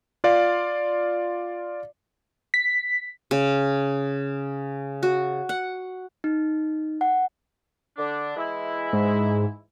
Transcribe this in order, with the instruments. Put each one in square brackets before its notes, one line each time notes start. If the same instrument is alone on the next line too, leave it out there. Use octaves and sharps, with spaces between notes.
[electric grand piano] F4 D5 F5
[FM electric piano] B6
[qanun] C#3
F#4
F#5
[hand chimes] D#4
F#5
[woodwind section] D3 D4
E3 G#3 E4
[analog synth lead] G#2